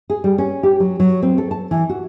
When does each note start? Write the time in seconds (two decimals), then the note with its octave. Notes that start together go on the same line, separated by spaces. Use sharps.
0.10 G#4
0.24 G3
0.38 C#4
0.63 G4
0.80 F#3
1.00 F#3
1.22 C4
1.38 A4
1.51 A5
1.71 E3
1.89 F#4